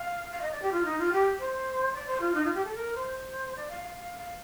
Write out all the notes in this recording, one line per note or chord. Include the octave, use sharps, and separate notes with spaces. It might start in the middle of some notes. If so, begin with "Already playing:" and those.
Already playing: F5
F5
D#5
D5
G4
F4
D#4
F4
G4
C5
D5
C5
F4
D#4
F4
G4
A4
A#4
C5
D5
F5
F5
F5
F5